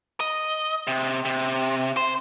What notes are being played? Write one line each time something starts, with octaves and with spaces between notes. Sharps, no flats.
D#5
C3
C3
C5